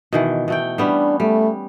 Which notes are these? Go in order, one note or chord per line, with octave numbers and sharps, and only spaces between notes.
B2 D#3 E3
B2 A3 G5
G3 B3 C#4 D4
G3 A3